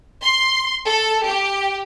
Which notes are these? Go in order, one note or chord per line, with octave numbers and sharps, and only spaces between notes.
C6
A4
G4